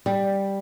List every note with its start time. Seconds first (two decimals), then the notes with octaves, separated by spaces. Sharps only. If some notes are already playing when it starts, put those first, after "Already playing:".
0.06 G3